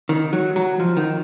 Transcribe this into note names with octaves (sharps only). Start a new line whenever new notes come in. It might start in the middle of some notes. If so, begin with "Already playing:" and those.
D#3
F#3
F#3
F3
D#3